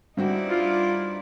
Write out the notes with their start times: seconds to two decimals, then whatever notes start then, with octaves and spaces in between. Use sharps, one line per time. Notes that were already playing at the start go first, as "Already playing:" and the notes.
0.17 G2 C4 D#4 E4 F#4 D5
0.50 F4